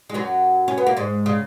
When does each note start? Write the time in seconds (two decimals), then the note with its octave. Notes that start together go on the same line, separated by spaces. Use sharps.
0.10 G#3
0.14 F#2 F#3
0.68 C#4
0.78 B3
0.87 A#3
0.97 G#2 G#3
1.26 C#3